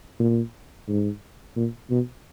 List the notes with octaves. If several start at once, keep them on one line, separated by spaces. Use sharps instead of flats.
A#2
G#2
A#2
B2